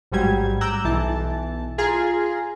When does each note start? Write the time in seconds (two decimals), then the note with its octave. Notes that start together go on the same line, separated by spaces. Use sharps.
0.12 A1 G#2 F#3 G3 G#6
0.61 A#5 D6 E6 F#6 G6
0.84 B1 E3 A5
1.78 F4 G#4 G#5 A#5 C6